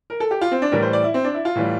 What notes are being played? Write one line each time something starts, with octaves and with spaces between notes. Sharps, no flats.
A#4
A4
G4
F4
C4
D4
A2 E3 G3 A#4
C5
D5
E4
C4
D4
E4
F4
A2 E3 G3